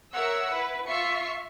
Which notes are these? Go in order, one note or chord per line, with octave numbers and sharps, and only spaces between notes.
A#4 C#5 E5 F#5 E6
E4 B4
F4 E5 C#6 C7 C#7